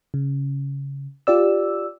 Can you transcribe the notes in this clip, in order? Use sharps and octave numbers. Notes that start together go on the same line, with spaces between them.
C#3
F4 G4 D5 E6